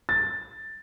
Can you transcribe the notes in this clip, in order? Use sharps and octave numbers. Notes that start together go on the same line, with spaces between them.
A6